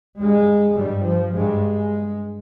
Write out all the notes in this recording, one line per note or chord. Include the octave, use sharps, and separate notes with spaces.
G2 G#3
G2 G3
F3
G2 G#3